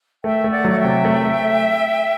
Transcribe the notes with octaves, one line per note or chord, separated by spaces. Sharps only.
A3 E5 G5
A3
D5 F#5
F#3
F#5
E5 G5
C3
A3
A3